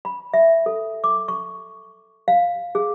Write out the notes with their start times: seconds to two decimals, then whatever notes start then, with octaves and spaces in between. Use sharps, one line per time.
0.05 B5
0.34 E5
0.66 A4
1.04 D6
1.28 C#6
2.28 F5
2.75 G#4